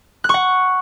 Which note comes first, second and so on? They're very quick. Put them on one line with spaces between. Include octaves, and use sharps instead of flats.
F#6 C#6 F#5